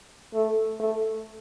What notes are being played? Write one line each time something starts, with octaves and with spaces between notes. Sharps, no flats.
A3
A3